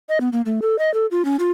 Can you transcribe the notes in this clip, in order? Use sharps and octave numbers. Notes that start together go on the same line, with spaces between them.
D#5
B3
A#3
A3
A4
D#5
A4
F4
C#4
F4